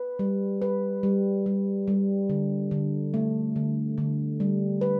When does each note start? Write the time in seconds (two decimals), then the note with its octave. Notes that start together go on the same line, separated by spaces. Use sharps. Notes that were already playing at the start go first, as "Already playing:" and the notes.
Already playing: B4
0.19 G3
0.62 B4
1.03 G3
1.46 G3
1.88 G3
2.30 D3
2.71 D3
3.14 A3
3.56 D3
3.98 D3
4.40 G3
4.81 B4